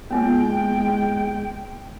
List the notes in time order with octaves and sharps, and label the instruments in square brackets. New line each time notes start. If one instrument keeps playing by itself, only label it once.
[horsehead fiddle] G#3 G5 [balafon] A#3 B3 F4